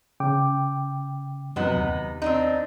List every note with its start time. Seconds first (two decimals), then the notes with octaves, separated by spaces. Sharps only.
0.20 C#3 G5 D6
1.56 F#2 C3 F#3 B3 D#4
1.76 D#2
2.22 C4 D4 D#4